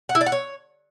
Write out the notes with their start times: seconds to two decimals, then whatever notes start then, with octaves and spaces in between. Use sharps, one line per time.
0.09 F#5
0.15 E4
0.21 D5
0.26 F#5
0.32 C#5